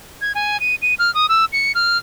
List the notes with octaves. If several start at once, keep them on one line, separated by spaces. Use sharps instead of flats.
G#6
G#5
D#7
D#7
F6
D#6
E6
C#7
F6